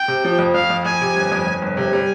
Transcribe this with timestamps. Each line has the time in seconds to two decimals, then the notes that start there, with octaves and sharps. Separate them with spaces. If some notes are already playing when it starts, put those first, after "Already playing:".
Already playing: G5
0.08 C3
0.25 F3
0.39 F2
0.54 F2 F5
0.70 F2
0.85 F2 G#5
1.01 C3
1.16 G1
1.32 F2
1.47 F2
1.62 G1
1.77 C3 G#5
1.93 G3